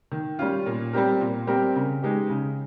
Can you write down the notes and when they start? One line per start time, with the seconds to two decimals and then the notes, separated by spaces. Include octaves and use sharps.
0.12 D#3
0.39 G3 C#4 F4
0.66 A#2
0.93 G3 C4 G4 A#4
1.21 A#2
1.47 G3 C4 G4 A#4
1.76 C#3
2.03 G#3 D#4 G4
2.30 C#3